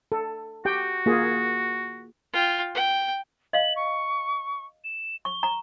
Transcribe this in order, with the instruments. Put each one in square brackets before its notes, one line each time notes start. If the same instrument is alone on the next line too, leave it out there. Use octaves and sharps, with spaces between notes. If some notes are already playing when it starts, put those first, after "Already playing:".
[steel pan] A4
[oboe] F#4 [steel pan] G4 G5
[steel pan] A#3 F4 G#4
[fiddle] F4 G5
G5
[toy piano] D#5 F5 [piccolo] F#7
[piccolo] C#6
E7
[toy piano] C#6 [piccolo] G7
[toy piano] A#5